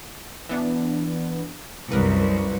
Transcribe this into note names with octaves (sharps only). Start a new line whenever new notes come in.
E3 B3 D4
C2 F#2 A#4 B4